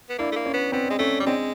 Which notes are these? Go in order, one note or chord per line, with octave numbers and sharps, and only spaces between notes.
B3
A#3 D4 E4
A3
A#3
C#4
B3
B3 C4
G#3
A3 C#4
G3
G#3 C4 D4